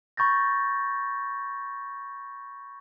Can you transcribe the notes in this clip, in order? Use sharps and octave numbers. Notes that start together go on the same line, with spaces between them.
B5 C#6 G6 A6 A#6